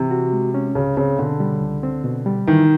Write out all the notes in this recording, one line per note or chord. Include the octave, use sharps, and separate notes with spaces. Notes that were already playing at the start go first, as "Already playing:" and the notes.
Already playing: C3 E3
F#4
G#3
C#4
C#2 C#3
C#3 C4
B2 D3
G3
C#2
C4
B2
G3
D#3 E3